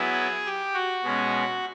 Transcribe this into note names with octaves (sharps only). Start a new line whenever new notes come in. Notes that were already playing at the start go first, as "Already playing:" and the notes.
Already playing: F#3 B3 E4 G#4
G4
F#4
B2 G#3 C#4